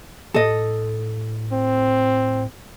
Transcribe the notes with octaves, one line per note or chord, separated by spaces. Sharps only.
A2 A4 D#5
C4